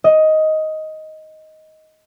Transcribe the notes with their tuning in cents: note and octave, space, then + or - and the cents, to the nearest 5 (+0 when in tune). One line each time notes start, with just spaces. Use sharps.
D#5 +10